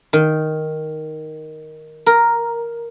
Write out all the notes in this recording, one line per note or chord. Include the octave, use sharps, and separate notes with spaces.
D#3
A#4